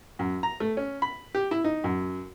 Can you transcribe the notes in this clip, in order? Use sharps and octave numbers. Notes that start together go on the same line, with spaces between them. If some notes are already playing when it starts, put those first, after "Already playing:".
F#2
A#5
A3
C#4
B5
G4
E4
D#4
F#2